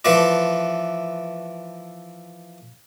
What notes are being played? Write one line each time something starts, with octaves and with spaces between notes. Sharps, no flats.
E3 F3 A3 E4 B4 D5